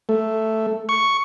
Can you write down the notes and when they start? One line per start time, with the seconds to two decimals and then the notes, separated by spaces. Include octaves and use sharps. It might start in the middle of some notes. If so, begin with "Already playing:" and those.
0.09 A3
0.89 C#6